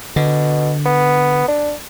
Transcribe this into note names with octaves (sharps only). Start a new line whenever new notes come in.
B2 D3
B3
D4